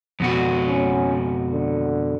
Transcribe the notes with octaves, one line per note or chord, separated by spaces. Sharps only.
F2 B2 F#4
C#4
D3